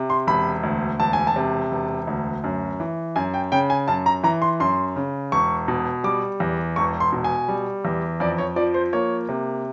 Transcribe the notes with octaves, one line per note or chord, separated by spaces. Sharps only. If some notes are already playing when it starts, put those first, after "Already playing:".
Already playing: C3
C6
E1 B5
D2
E1 A5
G#5
A5
C3
E1
D2
F#2
E3
F#2 G#5
G5
C#3 G5
G#5
F#2 A5
A#5
E3 A#5
C6
F#2 C6
C#3
E1 C#6
B2
G3 D6
E2
E1 C#6
C6
B2
G#5
G3
E2
F2 D5
C#5
F3 D5
C5
A#3 C#5
C3